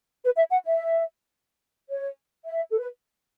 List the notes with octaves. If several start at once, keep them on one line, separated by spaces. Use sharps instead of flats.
B4
E5
F#5
E5
C#5
E5
A4
B4